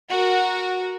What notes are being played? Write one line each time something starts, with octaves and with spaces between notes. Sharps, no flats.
F#4 A#4